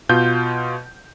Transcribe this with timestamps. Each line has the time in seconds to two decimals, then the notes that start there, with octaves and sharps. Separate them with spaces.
0.09 B2 F4 G6